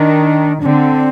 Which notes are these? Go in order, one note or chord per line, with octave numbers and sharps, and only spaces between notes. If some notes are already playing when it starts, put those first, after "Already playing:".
Already playing: D#3 D4
D3 C4 D4